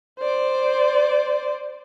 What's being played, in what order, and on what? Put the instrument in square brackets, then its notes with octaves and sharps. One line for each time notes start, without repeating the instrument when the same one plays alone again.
[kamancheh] C5 D5